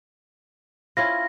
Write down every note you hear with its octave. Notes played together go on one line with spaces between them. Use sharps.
C#4 E4 F4 A#6